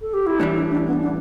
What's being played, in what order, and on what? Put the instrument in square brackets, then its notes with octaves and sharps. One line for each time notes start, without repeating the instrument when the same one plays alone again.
[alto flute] A4
G4
E4
[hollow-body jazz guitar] A2 E3 G3 [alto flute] D4
[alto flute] E4
D4
B3
D4